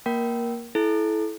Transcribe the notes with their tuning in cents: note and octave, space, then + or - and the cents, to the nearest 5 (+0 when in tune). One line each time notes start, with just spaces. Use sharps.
A#3 +0 A#4 +20 G5 -25
E4 +0 A4 -30